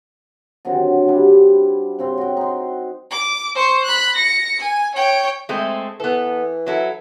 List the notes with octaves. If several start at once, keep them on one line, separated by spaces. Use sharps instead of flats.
D3 D#3 F#3 C4
G3 D4 E4
C#3 C4 C6
F#4 G5
D#4 C6
D6
C5 C#6
B5 F#6
A#6 C#7
G#5
C#5 G5
G#3 A3 C4
E3 B3 A4
F#3 E4 A4